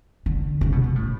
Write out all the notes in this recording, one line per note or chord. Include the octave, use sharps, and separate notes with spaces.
D3
C#3
B2
B2
A2